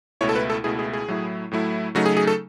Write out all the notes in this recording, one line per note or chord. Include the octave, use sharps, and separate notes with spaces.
C#2 B2 A3 E4 C#5
A4
B4
A4
C#2 B2 A3 E4 G#4
G#4
G#4
A2 F#3 A3 E4
A2 F#3 A3 E4
C#3 F#3 A3 D#4 F#4
G#4
G#4
A4